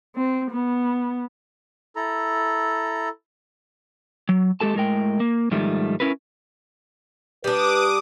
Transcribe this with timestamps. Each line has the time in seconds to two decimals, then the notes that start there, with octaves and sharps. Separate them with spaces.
0.16 C4
0.51 B3
1.96 E4 A4 A#5
4.29 F#3
4.61 G#3 G4 A4 A5
4.75 A2 G#3 A#4 G5
5.20 A#3
5.51 G#2 D#3 F3 G3 A3
6.00 C#4 E4 A#4 B4
7.44 G3 D4 B4 D6 D#6